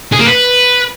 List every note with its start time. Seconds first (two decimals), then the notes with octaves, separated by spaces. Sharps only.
0.12 G#4
0.19 A#3
0.26 B4